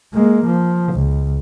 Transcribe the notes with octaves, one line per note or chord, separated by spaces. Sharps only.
G#3 A#3
F3
C#2